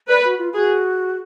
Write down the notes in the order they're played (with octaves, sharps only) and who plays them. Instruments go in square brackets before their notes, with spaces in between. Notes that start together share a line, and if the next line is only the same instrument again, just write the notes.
[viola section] B4 [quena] D5
[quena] F#4
F4
[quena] F#4 [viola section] G#4